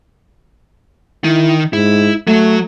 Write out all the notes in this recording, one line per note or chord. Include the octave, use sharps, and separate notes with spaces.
D#3 E4
G#2 E4
F#3 A3